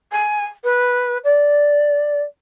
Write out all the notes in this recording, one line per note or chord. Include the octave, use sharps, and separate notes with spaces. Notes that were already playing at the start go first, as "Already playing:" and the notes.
G#5
B4
D5